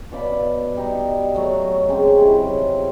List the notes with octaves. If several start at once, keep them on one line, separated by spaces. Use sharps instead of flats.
B2 D5 F5 B5
G3 D#4
F#3 A3
C#3 G#3 C4
C3 F#3 E4